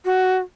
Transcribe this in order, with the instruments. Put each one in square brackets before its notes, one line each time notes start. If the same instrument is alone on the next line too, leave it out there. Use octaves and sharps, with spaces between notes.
[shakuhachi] F#4